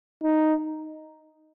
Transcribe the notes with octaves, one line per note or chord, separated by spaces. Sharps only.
D#4